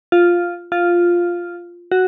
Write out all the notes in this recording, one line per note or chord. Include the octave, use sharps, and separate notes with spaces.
F4
F4
F#4